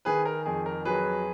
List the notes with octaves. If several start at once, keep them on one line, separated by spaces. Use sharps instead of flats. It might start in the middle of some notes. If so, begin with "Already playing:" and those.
D#3 G#4 B4
A#4
F2 G#4
A#4
F#3 G#4 B4